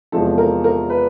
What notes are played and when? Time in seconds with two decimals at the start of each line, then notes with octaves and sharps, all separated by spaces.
0.12 E2 C3 F3 G#3 A4
0.38 A#4
0.64 A#4
0.90 B4